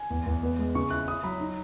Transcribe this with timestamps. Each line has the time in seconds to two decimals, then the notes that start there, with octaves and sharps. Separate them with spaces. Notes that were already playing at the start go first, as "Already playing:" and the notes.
Already playing: G#5
0.10 E2
0.26 E2
0.43 B3
0.59 G#3
0.75 C#3 C#6
0.91 E4 F#6
1.08 E4 D#6
1.23 F#3 B5
1.40 D#4